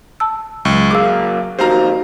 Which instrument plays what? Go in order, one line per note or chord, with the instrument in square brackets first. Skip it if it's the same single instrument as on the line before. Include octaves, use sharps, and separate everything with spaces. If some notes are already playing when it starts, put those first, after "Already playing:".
[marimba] A5 E6
[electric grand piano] C#2 C#6 [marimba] F#3
[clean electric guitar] F#2 A#3 F5 [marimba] G#4 E6 [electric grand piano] D6
[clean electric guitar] F2 D#3 A#3 [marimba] F#4 G4 [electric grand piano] C5 F5 A#5